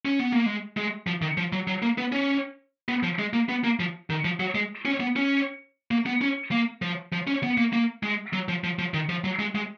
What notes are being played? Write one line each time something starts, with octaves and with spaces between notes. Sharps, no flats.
C#4
B3
A#3
G#3
G#3
F3
D#3
F3
F#3
F#3
A#3
B3
C#4
B3
F3
G#3
A#3
B3
A#3
F3
D#3
F3
F#3
G#3
C#4
B3
C#4
A#3
B3
C#4
A#3
F3
F3
C#4
B3
A#3
A#3
G#3
F#3
F3
F3
F3
D#3
F3
F#3
G#3
G#3